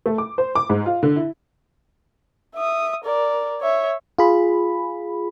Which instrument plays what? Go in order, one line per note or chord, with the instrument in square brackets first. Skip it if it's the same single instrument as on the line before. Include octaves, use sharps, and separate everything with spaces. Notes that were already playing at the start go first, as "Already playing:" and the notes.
[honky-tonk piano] A3
D6
C5
D6
G#2
F4
D3
E4
[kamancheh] E5 D#6
A#4 D5
C#5 E5
[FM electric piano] F4 G#4 B5